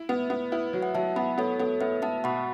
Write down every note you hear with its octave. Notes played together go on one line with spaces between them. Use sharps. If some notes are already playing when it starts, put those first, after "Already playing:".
Already playing: E4
B3 B4
B3 B4
E4 B4
F#3
F#5
F#3 E5 A5
B3 F#5 B5
B3 A4 C#5
B3 A4 C#5
B3 B4 E5
B3 E5 A5
B2 F#5 B5